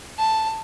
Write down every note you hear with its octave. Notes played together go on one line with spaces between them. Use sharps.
A5